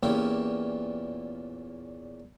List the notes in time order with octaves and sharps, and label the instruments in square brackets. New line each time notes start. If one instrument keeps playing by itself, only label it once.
[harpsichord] E2 A#2 A#3 C#4 E4 G4